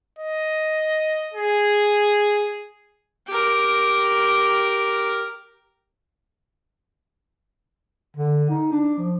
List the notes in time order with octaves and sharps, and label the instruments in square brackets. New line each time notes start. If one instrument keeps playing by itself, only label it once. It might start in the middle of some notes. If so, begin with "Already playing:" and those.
[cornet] D#5
G#4
[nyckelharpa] G4 A#4
[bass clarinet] D3
D#4
D4
F3